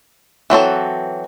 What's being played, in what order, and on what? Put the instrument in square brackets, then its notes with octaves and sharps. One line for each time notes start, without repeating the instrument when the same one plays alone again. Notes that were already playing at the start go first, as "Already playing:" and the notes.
[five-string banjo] E3 F#3 C4 A4